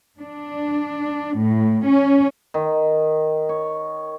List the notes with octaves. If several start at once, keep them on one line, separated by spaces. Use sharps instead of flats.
D4
A2
C#4
D#3
C#5